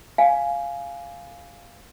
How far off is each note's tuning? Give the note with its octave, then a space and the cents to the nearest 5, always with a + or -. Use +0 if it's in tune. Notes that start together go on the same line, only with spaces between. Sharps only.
F5 +0 G#5 +10